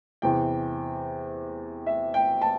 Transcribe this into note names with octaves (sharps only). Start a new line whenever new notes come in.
E2 C3 E3 G5
E5
G5
A5